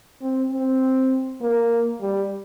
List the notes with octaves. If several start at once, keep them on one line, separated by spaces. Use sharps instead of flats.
C4
C4
A#3
G3